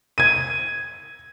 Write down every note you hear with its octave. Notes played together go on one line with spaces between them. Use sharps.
G#6 D#7